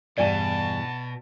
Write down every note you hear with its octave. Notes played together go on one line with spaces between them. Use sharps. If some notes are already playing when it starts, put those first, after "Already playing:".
E2 G2 B2 E3 D5 G#5 A5